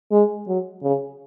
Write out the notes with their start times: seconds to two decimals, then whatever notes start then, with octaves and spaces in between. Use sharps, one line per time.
0.11 G#3
0.47 F#3
0.83 C#3